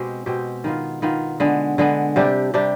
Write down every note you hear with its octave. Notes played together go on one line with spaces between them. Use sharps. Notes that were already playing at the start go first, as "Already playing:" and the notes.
Already playing: B2 G#3 C4 G4
B2 G#3 C4 G4
D#3 B3 F4
D#3 B3 F4
D3 G#3 B3
D3 G#3 B3
C3 G3 D4 G4
C3 G3 D4 G4